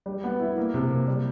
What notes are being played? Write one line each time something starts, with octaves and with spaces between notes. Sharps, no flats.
G3
B3
E4
A#3
C3
A#3
G3